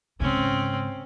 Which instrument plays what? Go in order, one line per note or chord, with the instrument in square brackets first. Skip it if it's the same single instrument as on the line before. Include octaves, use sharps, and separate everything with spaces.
[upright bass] G#2 C#3 [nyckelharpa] C4 C#4